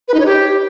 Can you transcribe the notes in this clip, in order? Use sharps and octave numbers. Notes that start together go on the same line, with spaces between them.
B4
D#4
C#5
G4